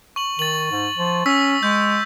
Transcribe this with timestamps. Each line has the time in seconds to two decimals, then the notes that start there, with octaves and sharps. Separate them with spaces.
0.16 C#6 F#7
0.39 D#3 A6 F#7
0.71 G#2
0.98 F3
1.26 C#4 C#6 E6 B6
1.63 G#3 G6